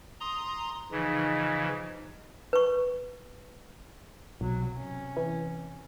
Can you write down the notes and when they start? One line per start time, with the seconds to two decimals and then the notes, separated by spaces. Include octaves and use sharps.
0.20 A#5 C6 D#6
0.92 C#3 E3 F3 D#4
2.53 B4 C#6
4.41 B1 C3 F#3
4.77 C3 C#4
5.17 E3